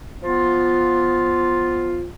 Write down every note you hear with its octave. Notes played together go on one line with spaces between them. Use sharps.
F3 B3 F4